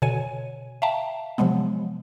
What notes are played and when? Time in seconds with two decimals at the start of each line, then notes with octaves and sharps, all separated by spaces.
0.02 B2 D3 C#5 G#5 D#7
0.82 E5 F5 G5 A5 A#5
1.38 C3 F3 F#3 G#3 B3